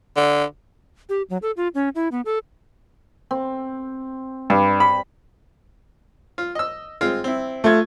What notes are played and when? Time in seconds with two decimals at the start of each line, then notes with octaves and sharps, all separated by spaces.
0.16 D3
1.09 G4
1.30 F#3
1.42 A4
1.57 F4
1.75 C#4
1.95 E4
2.12 B3
2.25 A4
3.31 C4
4.50 G2 G3
4.80 B5
6.38 F4
6.55 D#5 E6
7.01 G#3 C4 F4
7.24 C4 E4
7.64 A3 F4 G#6